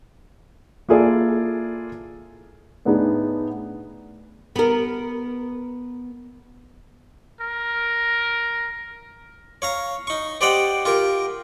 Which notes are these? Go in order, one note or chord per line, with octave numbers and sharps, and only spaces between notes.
A#3 E4 F4 G#4 A4 D5
A2 B3 D4 D#4 G#4
B3 A#4
A#4
C#5 F5 A#5
D#4 C#6
G4 C5 D5 D#5 F#5 G5
F4 G4 A#4